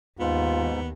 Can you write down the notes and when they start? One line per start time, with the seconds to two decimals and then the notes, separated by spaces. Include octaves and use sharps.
0.20 D#2 G#2 B3 F4